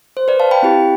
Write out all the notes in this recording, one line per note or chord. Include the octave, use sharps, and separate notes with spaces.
C5
B4 D5
F5 A5
G5 B5
C4 E4 G4